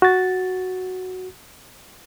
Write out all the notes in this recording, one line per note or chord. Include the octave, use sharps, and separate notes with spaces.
F#4 A6